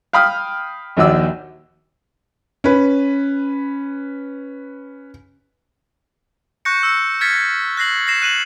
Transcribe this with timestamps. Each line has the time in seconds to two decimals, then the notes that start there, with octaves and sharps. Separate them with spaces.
0.13 F5 G5 B5 D#6 F6
0.97 A#1 D#2 F#4 D5 E6
2.64 C#4 B4
6.65 C#6 F#6 G6 A#6 C#7
6.83 E6 C#7
7.21 F6 G#6 A6 B6 C#7
7.77 F#6 A#6 C7 F#7
8.07 A#6 C7 E7
8.22 F#6 D#7 E7 F#7